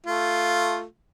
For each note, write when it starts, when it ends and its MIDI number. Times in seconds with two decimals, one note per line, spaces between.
0.06 0.83 57
0.06 0.83 65